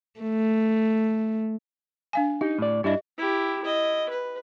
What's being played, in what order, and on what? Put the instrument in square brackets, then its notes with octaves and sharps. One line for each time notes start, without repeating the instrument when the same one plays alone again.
[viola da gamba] A3
[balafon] D4 F5 G#5
[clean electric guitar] D#4 [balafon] G4
[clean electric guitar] A2 D5
[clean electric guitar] G2 D4 E4 [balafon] G4 D#5
[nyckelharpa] E4 G4
E4 D#5
B4